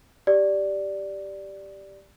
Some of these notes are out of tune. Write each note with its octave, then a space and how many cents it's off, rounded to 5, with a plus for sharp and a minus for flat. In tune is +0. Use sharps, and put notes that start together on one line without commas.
G4 +0 D5 +0